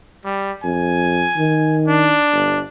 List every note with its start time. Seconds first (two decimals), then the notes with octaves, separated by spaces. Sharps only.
0.25 G3
0.64 F2 G#5
1.37 D#3
1.88 D4
2.33 G1